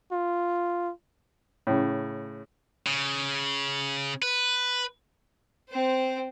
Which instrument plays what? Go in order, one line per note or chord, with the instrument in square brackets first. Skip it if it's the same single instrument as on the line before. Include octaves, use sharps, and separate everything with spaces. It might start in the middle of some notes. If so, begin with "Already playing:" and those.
[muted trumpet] F4
[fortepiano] A2 C#3
[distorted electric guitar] C#3
B4
[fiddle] C4 C5